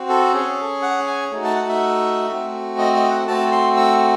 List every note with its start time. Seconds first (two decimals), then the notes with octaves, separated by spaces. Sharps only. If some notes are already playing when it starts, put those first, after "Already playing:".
Already playing: C4 F#4
0.09 A4
0.34 C#4 G#4
0.82 F#5
1.07 G#5
1.31 A3 D#4 F#4
1.44 A5
1.56 F#5
1.69 E5
2.30 A3 C4 F#4
2.78 D#5
2.95 D#5
3.11 F#5
3.28 A3 C4 F#4 A5
3.52 C6
3.77 E6